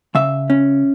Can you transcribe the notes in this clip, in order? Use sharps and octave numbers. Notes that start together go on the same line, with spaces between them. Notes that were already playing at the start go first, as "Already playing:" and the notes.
C#3 E5
C#4